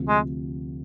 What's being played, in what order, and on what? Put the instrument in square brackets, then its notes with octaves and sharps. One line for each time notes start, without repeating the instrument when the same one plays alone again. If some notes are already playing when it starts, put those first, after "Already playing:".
Already playing: [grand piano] D2 C3 F3
[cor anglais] G#3